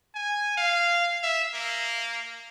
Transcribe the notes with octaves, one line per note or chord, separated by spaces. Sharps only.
G#5
F5
E5
A#3